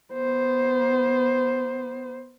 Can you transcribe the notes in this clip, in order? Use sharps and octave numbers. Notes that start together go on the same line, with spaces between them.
B3 C5